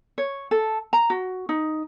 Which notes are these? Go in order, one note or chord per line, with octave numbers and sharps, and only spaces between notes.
C#5
A4
A#5
F#4
D#4